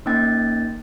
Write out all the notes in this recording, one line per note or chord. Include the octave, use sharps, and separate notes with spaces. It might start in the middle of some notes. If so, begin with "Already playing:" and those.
A#3 C#4 D#4 G5 A6